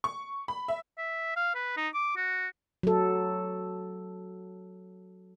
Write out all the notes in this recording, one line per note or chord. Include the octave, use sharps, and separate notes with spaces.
C#6
B5
E5
E5
F5
B4
D#4
D6
F#4
F#3 A4